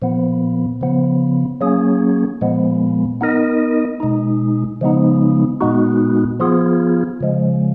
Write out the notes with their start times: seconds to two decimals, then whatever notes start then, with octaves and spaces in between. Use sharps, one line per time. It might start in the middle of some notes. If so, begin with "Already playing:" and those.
0.02 A#2 F3 B3
0.81 C#3 F3 B3
1.61 F#3 A#3 C#4 G#4
2.41 A#2 F3 G#3 B3
3.21 B3 D#4 A#4 D#5
4.00 B2 G#3 D#4
4.81 C#3 F3 G#3 B3 D#4
5.61 A#2 G#3 B3 D#4 F#4
6.40 F3 B3 F4 G#4
7.21 C#3 F3 G#3